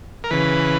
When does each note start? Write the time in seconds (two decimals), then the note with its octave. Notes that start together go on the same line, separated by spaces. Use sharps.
0.24 A#4
0.31 C#3 E3 B4